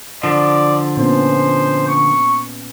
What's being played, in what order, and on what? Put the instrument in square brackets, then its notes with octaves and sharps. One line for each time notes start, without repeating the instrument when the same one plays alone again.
[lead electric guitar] D3 F3 [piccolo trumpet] D5
[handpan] A#2 B3 C#4 [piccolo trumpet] C5
[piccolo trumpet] C#6